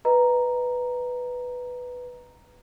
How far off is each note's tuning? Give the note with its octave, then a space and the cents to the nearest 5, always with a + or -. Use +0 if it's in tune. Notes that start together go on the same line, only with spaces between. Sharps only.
B4 +0 D#5 +5 A#5 +0